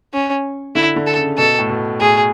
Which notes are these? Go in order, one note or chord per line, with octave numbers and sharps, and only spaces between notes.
C#4
D3 E4
D3
A4
C#3
B2 A4
A2
B2
A2 G#4